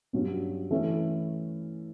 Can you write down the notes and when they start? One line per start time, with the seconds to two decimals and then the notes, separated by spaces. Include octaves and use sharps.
0.13 G2 F#3 C#4
0.70 E3 A3 C#4 E4